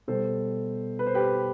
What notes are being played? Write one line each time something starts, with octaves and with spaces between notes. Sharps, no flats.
B2 G3 A4 C5
B4
C5
G4 B4